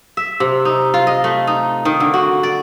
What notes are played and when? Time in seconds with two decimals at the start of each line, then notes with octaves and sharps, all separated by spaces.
0.17 E5
0.40 C3
0.65 D#4
0.94 F4
1.07 D#5
1.24 A3
1.47 D#4
1.85 D#3
2.00 D3
2.14 F#4
2.43 D5